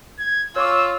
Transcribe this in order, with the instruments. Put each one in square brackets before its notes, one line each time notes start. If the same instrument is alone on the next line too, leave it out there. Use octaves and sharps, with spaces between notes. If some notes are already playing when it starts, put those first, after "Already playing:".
[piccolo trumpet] G#6
[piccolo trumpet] F4 [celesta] C#5 C#6 D6 [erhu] E6